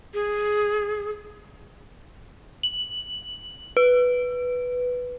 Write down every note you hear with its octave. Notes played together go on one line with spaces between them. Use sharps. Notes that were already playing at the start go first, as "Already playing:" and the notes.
G#4
F#7
B4